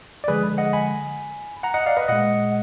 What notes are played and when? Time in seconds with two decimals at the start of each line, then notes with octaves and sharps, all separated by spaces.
0.24 D5
0.28 D3 F3 G#3 G#4 B4
0.58 D#5 F#5
0.73 G#5 B5
1.63 F#5 A#5
1.74 D#5 F#5
1.86 D5 F5
1.97 B4 D#5
2.08 A#2 G#3 D#5 F#5